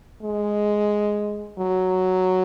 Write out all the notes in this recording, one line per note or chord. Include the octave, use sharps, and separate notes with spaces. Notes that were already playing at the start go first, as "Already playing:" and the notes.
G#3
F#3